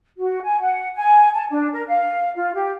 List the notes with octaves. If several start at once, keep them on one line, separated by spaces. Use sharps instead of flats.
F#4
G#5
F#5
G#5
A5
D4
A#4
F5
F4
G4